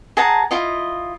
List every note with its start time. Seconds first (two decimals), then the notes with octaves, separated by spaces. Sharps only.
0.17 G#4 F#5 A5 A#5
0.51 E4 F4 D#5